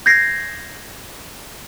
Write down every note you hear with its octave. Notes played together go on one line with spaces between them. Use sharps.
G6 G#6 A#6 C7